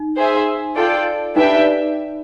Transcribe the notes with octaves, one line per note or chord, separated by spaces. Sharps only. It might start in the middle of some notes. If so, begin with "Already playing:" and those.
Already playing: D#4
G#4 C5 E5 G#5
F4 A4 D5 G5
D4 D#4 G4 B4 E5 G5